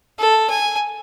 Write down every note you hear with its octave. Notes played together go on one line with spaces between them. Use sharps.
A4
G#5